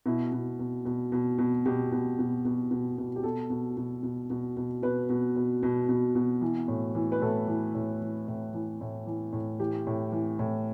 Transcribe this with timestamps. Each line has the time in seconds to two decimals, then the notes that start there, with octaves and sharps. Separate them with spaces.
0.06 B2 E4
0.32 B2
0.59 B2
0.85 B2
1.12 B2
1.38 B2
1.66 B2 G4
1.92 B2
2.19 B2
2.45 B2
2.71 B2
2.98 B2
3.16 G4
3.23 B2 A4
3.50 B2
3.77 B2
4.03 B2
4.30 B2
4.57 B2
4.82 B2 B4
5.09 B2
5.36 B2
5.63 B2
5.89 B2
6.15 B2
6.41 E3
6.68 A2
6.95 E3
7.12 B4
7.21 A2 A4
7.48 E3
7.75 A2
8.01 E3
8.28 A2
8.54 E3
8.81 A2
9.07 E3
9.33 A2
9.60 E3 G4
9.87 A2
10.12 E3
10.39 A2